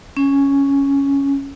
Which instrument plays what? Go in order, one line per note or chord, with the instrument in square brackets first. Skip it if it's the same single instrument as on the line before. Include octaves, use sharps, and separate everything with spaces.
[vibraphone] C#4